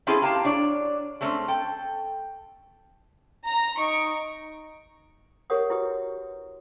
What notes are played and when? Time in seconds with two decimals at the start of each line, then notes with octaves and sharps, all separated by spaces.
0.07 C4 C#4 E4 F4 G#4 A4
0.22 A#3 G4 F5 A5
0.45 D4 C#5 D5
1.21 G#3 A3 C4 C#4
1.48 A4 G5
3.46 A#5
3.79 D#4 C#6 D7
5.50 G4 A#4 C#5 F#5 D#6
5.70 E4 F#4 G4 B4 D#6